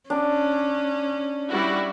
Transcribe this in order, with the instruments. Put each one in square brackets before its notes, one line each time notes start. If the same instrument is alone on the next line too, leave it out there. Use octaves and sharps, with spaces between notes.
[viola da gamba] C#4 [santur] D4
[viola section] G3 E4 F#4